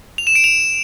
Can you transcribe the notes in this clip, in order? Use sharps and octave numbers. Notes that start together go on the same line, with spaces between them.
F7
E7
D7
F7